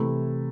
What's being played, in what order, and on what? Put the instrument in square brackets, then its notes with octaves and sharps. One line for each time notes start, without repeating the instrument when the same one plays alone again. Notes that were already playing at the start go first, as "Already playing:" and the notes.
Already playing: [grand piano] C3 E3 A3 E4